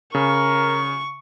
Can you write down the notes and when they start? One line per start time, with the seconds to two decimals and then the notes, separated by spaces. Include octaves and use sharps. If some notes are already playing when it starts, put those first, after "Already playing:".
0.15 C#3 A#4 C#6